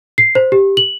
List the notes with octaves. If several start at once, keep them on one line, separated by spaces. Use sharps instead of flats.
C7
C5
G4
F#7